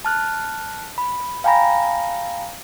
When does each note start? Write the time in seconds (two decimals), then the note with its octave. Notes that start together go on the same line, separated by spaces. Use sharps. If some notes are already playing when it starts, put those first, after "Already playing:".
0.05 A5 F6 F#6
0.98 B5
1.44 F5 G5 G#5 A#5 B5 A#6